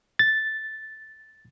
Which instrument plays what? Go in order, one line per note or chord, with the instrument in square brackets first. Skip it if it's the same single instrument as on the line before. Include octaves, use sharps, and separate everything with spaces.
[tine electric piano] A6